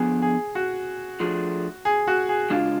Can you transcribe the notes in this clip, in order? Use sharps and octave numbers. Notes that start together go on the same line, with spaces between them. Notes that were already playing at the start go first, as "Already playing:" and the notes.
Already playing: D3 F3 B3 G#4
G#4
F#4
F3 A3 D4 F4 G#4
G#4
F#4
G#4
C#3 G#3 D4 F4